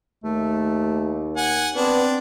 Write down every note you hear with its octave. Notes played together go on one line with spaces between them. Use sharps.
D#2 A3
F#5 G#5
B3 C4 D4